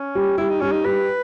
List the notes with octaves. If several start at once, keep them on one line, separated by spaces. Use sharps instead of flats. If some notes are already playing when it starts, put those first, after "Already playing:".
Already playing: C#4
G3
G3 E4
D#4
G3 C#4
D#4
G3 B4